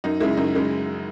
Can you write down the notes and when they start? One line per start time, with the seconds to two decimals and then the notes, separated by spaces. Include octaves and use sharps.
0.04 F#2 D#4
0.20 C#3 G#3 E4
0.37 F#2 D#4
0.55 C#3 G#3